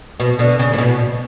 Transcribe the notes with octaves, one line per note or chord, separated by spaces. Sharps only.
B2
B2 D3
C#3
A2
B2